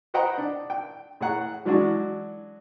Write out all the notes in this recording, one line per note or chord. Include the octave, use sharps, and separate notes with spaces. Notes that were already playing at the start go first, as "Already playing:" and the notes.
B4 C5 D#5 F#5 G5 A#5
D4
G5
A2 G#4 C#5 F#5 A#5
E3 F#3 G#3 C#4 D4 F#4